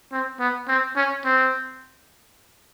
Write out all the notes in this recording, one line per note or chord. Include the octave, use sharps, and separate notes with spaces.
C4
B3
C4
C#4
C4